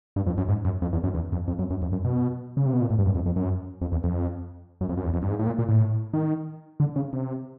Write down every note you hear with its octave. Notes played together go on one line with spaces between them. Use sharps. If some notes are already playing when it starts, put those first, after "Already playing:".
G2
F2
F#2
G#2
F#2
F2
E2
F#2
E2
F2
F2
F#2
F#2
F2
F#2
B2
C#3
C3
B2
A#2
A2
G2
F#2
F2
F2
F#2
F2
E2
F2
F#2
F2
F#2
E2
F2
G2
G#2
A2
A#2
A#2
A2
D#3
D3
C#3
C3